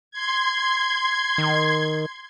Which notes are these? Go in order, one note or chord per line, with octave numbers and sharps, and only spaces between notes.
C6 G#6
D#3